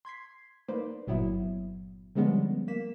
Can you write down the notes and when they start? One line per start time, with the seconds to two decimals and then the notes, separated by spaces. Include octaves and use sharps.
0.05 C6 G#6 B6 C7
0.68 A#3 D#4 B4 C5 D5
1.07 G1 A#2 F#3 B3 E4 E5
2.15 D3 F3 G3 G#3 B3 C#4
2.68 A#3 B6 E7